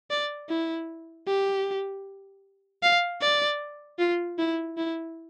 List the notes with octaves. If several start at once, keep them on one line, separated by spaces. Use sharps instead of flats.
D5
E4
G4
F5
D5
F4
E4
E4